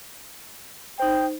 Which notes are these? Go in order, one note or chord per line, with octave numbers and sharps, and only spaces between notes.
D#4 C5 G5